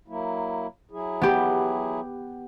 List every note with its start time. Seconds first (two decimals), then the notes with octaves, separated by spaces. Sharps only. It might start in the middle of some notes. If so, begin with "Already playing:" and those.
0.08 F#3 A#3 E4
0.91 F#3 E4 G#4
1.21 B3 G4